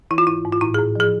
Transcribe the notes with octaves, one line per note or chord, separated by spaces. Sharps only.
E3 E4
F4
G#2 E4
G#2
F4
A2 E4
G#4
A2
F3 G#4